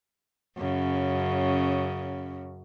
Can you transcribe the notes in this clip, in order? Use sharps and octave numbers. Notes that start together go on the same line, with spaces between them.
F#2 C#3